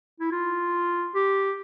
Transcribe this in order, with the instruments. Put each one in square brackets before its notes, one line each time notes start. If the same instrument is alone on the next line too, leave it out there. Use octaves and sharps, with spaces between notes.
[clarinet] E4
F4
G4